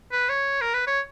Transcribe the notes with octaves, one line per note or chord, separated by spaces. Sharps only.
B4
C#5
A#4
B4
C#5